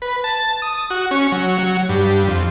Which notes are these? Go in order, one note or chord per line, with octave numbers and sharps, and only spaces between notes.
B4
A5
D#6
F#4
C#4
F#3
F#3
G2
F2